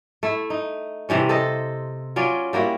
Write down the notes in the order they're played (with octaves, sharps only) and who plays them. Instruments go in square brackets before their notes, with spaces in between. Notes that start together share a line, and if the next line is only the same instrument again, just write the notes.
[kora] A3 E4
D#4
C3 E3 G3 C#4
A4 C5 D#5
F#3 C#4 F4 D5
G3 A#3 E4 F#4